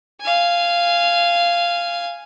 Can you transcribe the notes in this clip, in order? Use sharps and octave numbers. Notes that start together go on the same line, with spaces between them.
F5 G#5